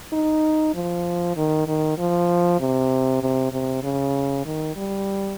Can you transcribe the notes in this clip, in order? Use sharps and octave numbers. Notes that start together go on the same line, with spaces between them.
D#4
F3
D#3
D#3
F3
C3
C3
C3
C#3
D#3
G3